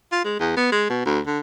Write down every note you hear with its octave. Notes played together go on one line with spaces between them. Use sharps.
F4
G#3
E2
B3
G#3
B2
D2
D3